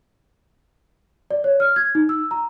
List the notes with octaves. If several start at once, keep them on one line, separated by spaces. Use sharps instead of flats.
D5
C#5
F6
G#6
D#4
E6
A#5